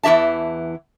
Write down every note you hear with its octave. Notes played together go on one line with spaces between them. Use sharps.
E2 E3 G#4 E5 A5